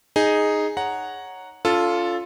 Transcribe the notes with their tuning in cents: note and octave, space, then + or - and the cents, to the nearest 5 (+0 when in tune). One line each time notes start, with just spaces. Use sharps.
D#4 +0 G#4 +0
C#5 +0 F#5 +0 A#5 +0
C#4 +40 F4 +0 A4 +0